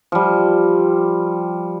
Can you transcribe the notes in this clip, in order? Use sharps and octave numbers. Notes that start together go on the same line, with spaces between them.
F3 G3